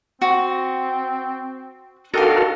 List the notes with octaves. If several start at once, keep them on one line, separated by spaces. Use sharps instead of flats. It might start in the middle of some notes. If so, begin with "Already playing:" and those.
C4 F#4
D4 D#4 F#4 G4 A4 A#4 F5